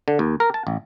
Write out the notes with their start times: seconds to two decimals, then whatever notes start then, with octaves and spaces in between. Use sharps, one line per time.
0.08 D3
0.19 D#2
0.40 A#4
0.54 A5
0.67 A1